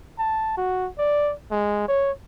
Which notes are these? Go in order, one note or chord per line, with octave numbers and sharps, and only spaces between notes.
A5
F#4
D5
G#3
C#5